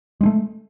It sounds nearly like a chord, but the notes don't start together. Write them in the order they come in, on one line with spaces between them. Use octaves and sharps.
G#3 C#4 A3